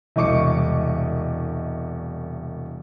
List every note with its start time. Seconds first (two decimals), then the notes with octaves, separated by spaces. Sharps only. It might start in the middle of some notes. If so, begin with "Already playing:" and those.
0.16 E1 C2 D#5 C#6 D6 C#7